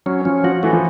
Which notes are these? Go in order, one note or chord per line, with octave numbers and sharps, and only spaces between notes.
F#3 C#4
F3 C#4
F3 F#4
E3 A3
F3